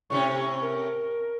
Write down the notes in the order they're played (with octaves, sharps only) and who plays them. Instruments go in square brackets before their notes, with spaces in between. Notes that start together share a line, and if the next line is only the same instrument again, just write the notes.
[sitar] A2 C3 C#4 [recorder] C#6
[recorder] A#4